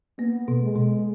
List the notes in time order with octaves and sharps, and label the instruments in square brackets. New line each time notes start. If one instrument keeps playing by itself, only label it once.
[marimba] A#3 [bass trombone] B3
[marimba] B2
[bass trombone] G#3
[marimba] B2